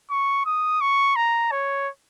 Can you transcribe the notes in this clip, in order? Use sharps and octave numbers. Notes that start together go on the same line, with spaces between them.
C#6
D#6
C#6
A#5
C#5